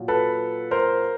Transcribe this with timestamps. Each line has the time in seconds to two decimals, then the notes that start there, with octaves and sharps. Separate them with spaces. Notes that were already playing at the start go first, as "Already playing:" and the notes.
Already playing: A#2 F#3
0.08 A4 B4
0.71 A#4 C5